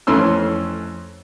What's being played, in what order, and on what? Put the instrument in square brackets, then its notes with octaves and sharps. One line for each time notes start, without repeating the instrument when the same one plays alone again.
[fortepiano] F2 E3 A3 C#4 C6 E6